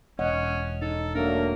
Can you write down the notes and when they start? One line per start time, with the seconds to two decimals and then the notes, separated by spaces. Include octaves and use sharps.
0.19 E1 C#4 C#5 D#5 F#5
0.82 D#4 A4
1.15 F#3 A3 A#3 D4 A#4